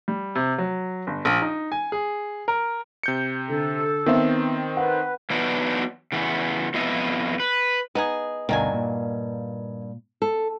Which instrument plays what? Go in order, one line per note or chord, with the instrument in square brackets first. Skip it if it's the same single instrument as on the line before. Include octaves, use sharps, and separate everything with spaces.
[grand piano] G3
C3
F#3
G1
A#1
D#4
G#5
G#4
A#4
[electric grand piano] C3 G6 C#7
[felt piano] D3 [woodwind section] A4
[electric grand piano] D#3 C4 [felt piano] B3 E5
[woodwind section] B4 [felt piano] F#5
[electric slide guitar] E3 F#3 B3 D4 D#4
C#3 E3 B3
F2 B3 E4 D#5
B4
[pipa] B3 D#4 G#4 [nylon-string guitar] D#5
[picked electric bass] D2 B2 [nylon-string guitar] G2 A#3 [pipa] D#3 F#3 G#5
[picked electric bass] A#2
[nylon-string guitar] A4